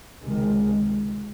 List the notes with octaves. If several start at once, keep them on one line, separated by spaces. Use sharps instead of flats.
C#2 C3 D#3 G#3